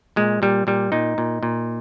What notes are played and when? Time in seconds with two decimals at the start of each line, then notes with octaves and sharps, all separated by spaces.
0.16 A#2 G#3
0.42 A#2 G3
0.67 A#2 G3
0.92 A#2 D#4
1.18 A#2
1.43 A#2